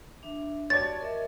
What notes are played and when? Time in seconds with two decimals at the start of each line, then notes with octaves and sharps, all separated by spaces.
0.23 D4 E5
0.70 F#4 G4 C#5 D5 A5 A6
1.01 A#4 D#5 E5